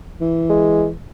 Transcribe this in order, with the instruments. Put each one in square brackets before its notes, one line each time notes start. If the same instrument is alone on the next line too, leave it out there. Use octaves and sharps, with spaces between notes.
[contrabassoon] E3
[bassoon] G#3